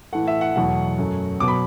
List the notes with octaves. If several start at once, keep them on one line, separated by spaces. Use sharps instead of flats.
A2 E3 A3 F#5
E5
F#5
E2 B2 F#3 A3 F#5
F#2 F#3 A3
B2 F#3 B3 D6
B5